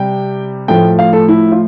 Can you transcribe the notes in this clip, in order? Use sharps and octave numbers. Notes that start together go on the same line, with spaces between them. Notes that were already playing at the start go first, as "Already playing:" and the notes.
Already playing: C3 G3 G5
A2 F3 A3 G5
F5
A4
E4
F4